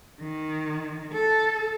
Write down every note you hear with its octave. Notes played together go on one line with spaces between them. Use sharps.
D#3
A4